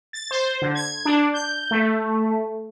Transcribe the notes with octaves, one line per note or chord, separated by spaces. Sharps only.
A6
C5
D3
G#6
D4
G6
A3